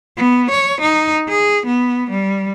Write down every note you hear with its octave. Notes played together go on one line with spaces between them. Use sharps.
B3
C#5
D#4
G#4
B3
G3